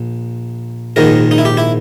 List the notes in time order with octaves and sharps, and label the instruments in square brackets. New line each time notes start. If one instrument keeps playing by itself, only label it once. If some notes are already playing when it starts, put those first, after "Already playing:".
Already playing: [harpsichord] A#1
A#1 G#2 D#3 A#4
D#4
E4
G4
E4